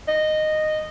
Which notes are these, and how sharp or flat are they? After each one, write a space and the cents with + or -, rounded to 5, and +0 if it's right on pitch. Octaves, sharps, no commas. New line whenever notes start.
D#5 -10